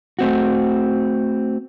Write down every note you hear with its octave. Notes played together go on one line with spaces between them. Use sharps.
A3 C4 F#4